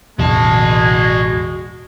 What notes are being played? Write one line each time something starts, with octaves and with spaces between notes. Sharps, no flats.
A1 E2 B2 G#3 F#4 A5